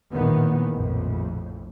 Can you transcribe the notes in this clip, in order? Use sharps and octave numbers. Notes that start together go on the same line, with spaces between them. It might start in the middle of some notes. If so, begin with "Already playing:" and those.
A#1 E2 A2 D#3 A#3 B3
A#1 F2 A2